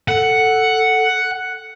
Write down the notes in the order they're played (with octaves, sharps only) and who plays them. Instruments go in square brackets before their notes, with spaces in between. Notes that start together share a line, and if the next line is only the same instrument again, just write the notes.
[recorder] A4 [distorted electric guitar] F#5